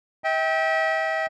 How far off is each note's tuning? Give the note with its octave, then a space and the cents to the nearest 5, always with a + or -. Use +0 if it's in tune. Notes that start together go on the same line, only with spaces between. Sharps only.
E5 -40 G5 +0